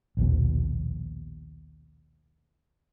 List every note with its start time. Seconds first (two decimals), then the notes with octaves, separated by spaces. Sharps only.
0.17 A#1 D#2 B2